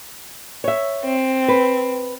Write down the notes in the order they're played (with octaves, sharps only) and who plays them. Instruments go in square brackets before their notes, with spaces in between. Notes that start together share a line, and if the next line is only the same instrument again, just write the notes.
[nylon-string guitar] C#5 E5
[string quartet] C4
[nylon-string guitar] B4